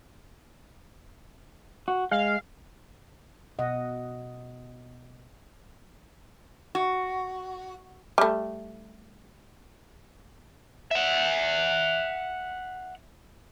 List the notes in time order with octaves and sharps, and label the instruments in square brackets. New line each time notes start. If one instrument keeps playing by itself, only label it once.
[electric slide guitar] F#4
[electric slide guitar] G#3 [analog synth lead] F5
[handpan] B2 D#5 F#5
[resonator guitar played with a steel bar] F#4
[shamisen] G3 A3
[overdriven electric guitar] E5 F#5